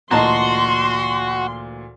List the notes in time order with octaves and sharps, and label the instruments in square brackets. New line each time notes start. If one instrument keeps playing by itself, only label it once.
[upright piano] D2 A#2 E3 [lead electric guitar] F#4 [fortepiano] D#5 A5 A#5 [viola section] C6